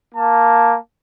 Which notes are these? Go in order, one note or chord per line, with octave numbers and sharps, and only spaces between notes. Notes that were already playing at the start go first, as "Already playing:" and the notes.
A#3 A5